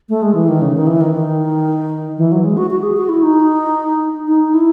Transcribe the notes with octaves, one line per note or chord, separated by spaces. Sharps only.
A3
G#3
E3
D#3
C#3
D#3
E3
D#3
D#3
E3
F#3
G#3
F#4
F#4
G#4
F#4
E4
D#4
D#4
E4